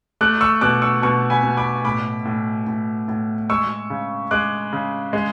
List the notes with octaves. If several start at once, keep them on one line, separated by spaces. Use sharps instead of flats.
A3 D6 F#6
C#6 E6
B2 D6 F#6
C#6 E6
B2 A5 C#6
G#5 B5
B2
B5 D6
A2 B5 D6
A2
A2
A2
G#3 C#6 E6
C#3
G#3 D6 F#6
C#3
G#3